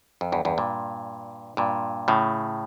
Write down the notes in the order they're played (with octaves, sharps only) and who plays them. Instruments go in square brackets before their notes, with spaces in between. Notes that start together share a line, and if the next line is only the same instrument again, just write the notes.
[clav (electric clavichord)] F2
E2 G2
E2 G2
G2 A#2
G2 A#2
A2 C#3